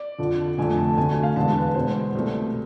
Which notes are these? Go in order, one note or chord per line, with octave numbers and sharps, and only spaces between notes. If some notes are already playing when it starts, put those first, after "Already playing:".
Already playing: D5
F2 D3 F3
F1 F2 D3 A3 G#5
A5
D2 D3 A3 G#5
G#5
F5
E1 E2 D3 G#3 A5
B4
E2 B2 G#3 C5
C2 B2 A3